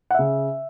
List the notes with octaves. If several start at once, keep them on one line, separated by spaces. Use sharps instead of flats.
F#5
C#3 E5